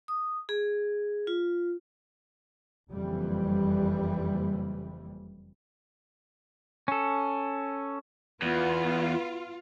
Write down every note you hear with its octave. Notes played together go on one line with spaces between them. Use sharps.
D#6
G#4
F4
F#1 F2 E3 G3
C#4 A4
E2 B3 F4